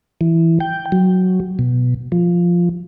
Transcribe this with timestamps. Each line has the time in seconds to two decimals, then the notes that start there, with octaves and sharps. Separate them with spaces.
0.21 E3
0.60 G5
0.92 F#3
1.59 B2
2.12 F3